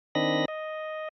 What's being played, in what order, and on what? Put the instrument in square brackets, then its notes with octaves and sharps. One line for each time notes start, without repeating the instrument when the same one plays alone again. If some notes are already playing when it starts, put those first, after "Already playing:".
[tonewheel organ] D#3 C4 D4 D#5 B5 A#6
D#5